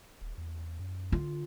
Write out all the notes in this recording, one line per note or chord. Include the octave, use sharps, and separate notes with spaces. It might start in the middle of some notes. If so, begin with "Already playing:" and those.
D#1
E2
F#2
D3 F4